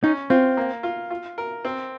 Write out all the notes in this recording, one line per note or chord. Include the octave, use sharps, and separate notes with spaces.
C#4 D#4
C4 F4
A#3
F4
F4
A#4
C4